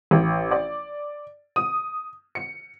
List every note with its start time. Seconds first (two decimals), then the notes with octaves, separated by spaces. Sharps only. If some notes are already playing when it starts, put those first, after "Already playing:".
0.11 A1
0.51 D5
1.56 D#6
2.35 C#7